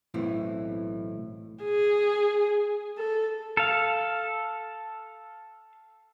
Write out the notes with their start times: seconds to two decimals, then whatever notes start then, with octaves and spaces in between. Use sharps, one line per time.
0.14 B1 A2 E3 C4
1.63 G#4
2.98 A4
3.57 A4 F5